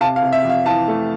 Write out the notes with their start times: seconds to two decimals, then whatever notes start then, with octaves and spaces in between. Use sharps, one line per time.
0.01 C3 F5 A5
0.16 F5
0.22 C3
0.33 E5
0.44 F2
0.49 F5
0.66 E3 F5 A5
0.88 A3